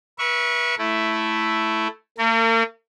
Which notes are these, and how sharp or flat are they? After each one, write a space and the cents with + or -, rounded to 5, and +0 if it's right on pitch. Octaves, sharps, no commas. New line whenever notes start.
B4 -35 E5 +0 C#6 +0
A3 +0 E4 +0
A#3 -45 A#4 -35